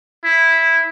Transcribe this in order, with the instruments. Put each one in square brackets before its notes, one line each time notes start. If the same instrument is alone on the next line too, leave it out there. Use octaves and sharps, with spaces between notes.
[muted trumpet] E4